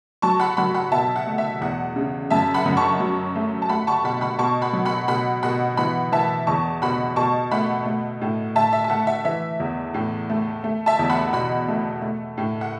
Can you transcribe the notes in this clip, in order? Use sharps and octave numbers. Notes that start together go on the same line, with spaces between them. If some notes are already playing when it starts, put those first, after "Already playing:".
F#3 A5 C#6
F#5 B5
F#3 F#5 B5
F#5 B5
B2 E5 A5
F#5
A3
E5
E2 F#5
C#3
F#2 E5 A5
F#5 B5
F#2
A5 C#6
F#3
A3
A5
A3 F#5 B5
A5 C#6
B2 F#5 B5
F#5 B5
B2 A5 C#6
F#5 B5
F#3
F#5 B5
B2 F#5 B5
B2 F#5 B5
E3 F#5 B5
E3 E5 A5
E2 A5 C#6
B2 F#5 B5
B2 A5 C#6
A3 F#5 B5
A3
A2
A2 E5 A5
E5
A5
A3 F#5
E5
E3 E5
E2
A2
A3
A3
E5 A5
E2
F#5 B5
B2 F#5 B5
A3
A3
A2
F#5